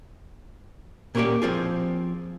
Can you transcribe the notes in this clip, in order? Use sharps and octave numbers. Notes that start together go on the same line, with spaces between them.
A#2 A#3 C#4 F4 G4 D5
F3 C4 F4 G#4